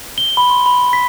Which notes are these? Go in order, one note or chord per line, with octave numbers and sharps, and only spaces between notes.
G7
B5
C6
B5
B6